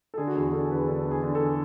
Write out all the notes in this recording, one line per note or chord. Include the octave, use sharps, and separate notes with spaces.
A4
D3 G#4
F#4
E2 G#4
D3 A4
E2 B4
D3 A4
E2
G#4
D3
A4